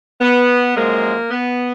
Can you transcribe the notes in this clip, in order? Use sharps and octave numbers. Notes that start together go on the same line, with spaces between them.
B3
F#2 F3 G#3 A#3
B3